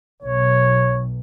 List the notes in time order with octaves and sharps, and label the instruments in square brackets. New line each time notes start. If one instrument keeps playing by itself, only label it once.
[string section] B1 [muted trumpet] C#5